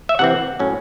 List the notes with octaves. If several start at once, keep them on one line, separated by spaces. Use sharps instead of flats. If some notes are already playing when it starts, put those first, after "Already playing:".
E5
C3 E3 C4 F#5
A2 F#3 C#4